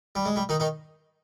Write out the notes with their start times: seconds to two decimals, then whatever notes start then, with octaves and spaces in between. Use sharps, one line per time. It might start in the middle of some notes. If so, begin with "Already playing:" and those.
0.15 G3
0.26 G#3
0.36 G3
0.49 D#3 D#4
0.60 D#3 D#4